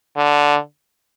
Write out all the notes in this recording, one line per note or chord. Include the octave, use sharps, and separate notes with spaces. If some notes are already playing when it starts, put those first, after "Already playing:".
D3